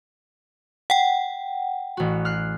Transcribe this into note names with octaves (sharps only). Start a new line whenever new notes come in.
F#5 G5
A1 F#4
F6 F#6 C7